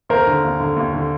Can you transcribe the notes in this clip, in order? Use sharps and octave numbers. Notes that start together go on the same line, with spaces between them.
D#2 A#4 C5
D3
D#2
D3
D#2
D3